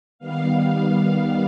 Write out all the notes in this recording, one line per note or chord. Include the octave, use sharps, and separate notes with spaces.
D#3 G3 B3 F5
F5